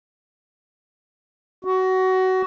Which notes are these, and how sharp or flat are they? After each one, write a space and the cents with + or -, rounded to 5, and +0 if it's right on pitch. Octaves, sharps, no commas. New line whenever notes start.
F#4 +20